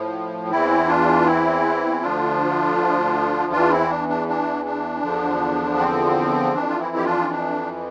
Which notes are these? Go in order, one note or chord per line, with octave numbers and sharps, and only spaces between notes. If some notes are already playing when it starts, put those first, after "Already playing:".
Already playing: A2 F3
E2 E3 C4 E4
D4 F4
C4 E4
D2 D3 F3 D4 F4
E2 E3 D4 F4
C4 E4
D4
D4
D4
D4
E2 D3 F3
C4
F2 E3 D4
F4
C4 E4
G4
D4 F4
D4